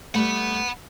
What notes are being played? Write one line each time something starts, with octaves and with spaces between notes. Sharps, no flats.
G3 A3 F#5 B5